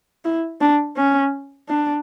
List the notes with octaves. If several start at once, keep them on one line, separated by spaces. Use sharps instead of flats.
E4
D4
C#4
D4